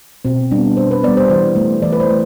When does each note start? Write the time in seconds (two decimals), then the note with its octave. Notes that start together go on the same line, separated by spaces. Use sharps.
0.25 B2 C4
0.51 G3 B3 D4
0.77 B2 C5
0.91 B4
1.03 G3 B3 D5
1.17 C5
1.30 E3 C5
1.56 A3
1.82 E3 D5
1.93 B4
2.00 C5
2.09 A3